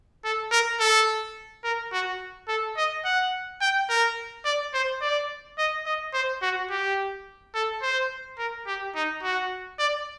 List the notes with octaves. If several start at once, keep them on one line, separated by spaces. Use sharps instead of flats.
A4
A#4
A4
A#4
F#4
A4
D#5
F#5
G5
A#4
D5
C5
D5
D#5
D#5
C5
F#4
G4
A4
C5
A#4
G4
D#4
F#4
D5